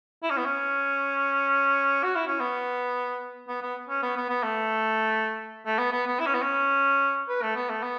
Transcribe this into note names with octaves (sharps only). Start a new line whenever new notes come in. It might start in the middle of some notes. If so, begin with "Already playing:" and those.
E4
C#4
B3
C#4
F#4
E4
C#4
B3
B3
B3
C#4
B3
B3
B3
A3
A3
B3
B3
B3
E4
C#4
B3
C#4
B4
A3
B3
A3
B3